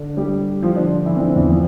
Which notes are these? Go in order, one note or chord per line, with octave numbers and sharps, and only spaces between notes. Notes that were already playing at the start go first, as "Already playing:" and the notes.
Already playing: D3 D4
G3 G4
F3 F4
D3 D4
E3 E4
C4
D3 D4
E2 E3
F3